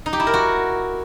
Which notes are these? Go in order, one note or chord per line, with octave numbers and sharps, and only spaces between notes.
D#4
G4
E4
A#4
F#4